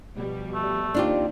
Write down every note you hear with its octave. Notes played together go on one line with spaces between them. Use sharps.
B2 F3 G3
A3
D#2 D#3 C4 D4 F4 G4